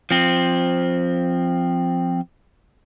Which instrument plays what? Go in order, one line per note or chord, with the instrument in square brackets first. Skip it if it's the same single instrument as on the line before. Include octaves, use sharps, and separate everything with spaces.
[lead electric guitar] F3 C4